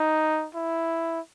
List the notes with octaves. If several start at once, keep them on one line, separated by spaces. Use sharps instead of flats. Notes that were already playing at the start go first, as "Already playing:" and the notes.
Already playing: D#4
E4